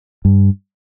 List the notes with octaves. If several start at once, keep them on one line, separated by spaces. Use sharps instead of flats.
G2